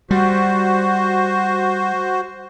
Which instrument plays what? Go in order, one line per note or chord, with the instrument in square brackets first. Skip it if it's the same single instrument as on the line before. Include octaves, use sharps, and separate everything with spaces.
[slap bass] G3 [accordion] F#4 C5